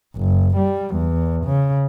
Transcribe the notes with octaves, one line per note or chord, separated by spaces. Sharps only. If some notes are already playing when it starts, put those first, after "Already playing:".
F#1
G3
E2
C#3